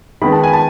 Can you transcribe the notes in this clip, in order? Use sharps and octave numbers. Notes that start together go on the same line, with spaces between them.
D#3 G#3 B3 B5
A5
G#5
A5